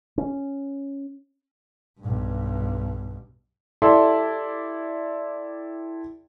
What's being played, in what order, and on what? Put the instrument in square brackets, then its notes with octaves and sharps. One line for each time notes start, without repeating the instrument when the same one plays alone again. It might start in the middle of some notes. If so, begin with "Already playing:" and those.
[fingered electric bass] C#4
[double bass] B1 G2
[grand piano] E4 G4 A4 D5 E5 C6